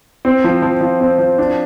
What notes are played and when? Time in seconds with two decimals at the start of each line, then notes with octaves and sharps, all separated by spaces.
0.25 C4
0.44 F3
0.62 F3
0.81 F3
1.01 C4
1.19 F3
1.38 D4